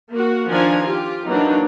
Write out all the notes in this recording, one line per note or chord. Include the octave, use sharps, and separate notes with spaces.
A#3 F#4
D#3 F3 D4 C5 G#5 A#5
F4 G4
E3 F#3 A#3 D4 D#4